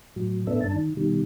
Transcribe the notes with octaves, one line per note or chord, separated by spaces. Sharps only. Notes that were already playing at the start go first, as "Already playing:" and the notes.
A2 F#3
A2 B3 D4 A4 E5
G2 D4 A5
D#3
B2 D#3 G3